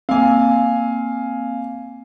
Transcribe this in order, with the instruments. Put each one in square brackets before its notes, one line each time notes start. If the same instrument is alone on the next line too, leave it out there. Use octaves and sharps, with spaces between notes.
[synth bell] A#3 C4 [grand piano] F5 G#5